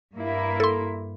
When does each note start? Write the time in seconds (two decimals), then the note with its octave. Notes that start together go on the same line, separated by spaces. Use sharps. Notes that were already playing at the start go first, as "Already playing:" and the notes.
0.15 G2 A#3 E4
0.60 A4 C6